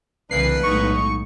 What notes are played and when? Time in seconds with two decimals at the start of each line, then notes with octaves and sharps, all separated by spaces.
0.31 C2 C#3 E3 A#3 D4 B4 C7
0.63 B1 A2 G#3 D#4 C#6